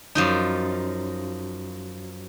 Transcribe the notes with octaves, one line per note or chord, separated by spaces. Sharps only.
F#2 F3 D#4